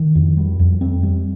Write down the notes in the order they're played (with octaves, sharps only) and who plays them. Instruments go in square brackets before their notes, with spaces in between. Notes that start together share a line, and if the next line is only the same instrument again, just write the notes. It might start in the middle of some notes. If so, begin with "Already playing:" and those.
Already playing: [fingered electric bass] D#3
F2
G3
F2
C4
G3